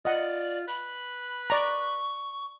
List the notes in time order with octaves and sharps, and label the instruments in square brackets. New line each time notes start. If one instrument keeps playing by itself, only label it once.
[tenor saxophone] F4 [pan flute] D5 [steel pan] D#5 F#5
[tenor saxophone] B4 [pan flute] B5
[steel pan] D5 A#5 [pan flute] C#6